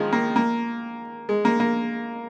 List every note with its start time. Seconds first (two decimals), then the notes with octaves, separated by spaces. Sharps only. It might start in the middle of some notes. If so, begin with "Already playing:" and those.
Already playing: D#3 F3 G#3
0.12 A#3
0.36 A#3
1.29 G#3
1.45 A#3
1.60 A#3